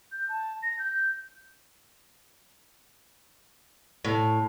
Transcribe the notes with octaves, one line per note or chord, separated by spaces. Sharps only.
G6
A5
A#6
G6
A2